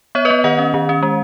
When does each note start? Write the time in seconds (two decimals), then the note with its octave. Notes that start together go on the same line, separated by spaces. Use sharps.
0.15 B3 C#5 E5
0.25 B4 D#5
0.30 B3
0.44 D#3 D#5 F#5
0.59 C#4
0.74 D#3
0.89 C#4
1.03 G#3